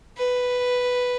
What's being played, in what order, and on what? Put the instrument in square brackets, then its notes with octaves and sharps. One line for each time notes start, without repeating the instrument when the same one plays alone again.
[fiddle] B4